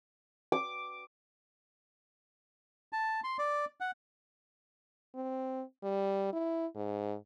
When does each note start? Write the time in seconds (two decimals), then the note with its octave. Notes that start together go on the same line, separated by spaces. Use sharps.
0.52 D6
2.93 A5
3.24 C6
3.39 D5
3.80 F#5
5.15 C4
5.83 G3
6.33 E4
6.75 G#2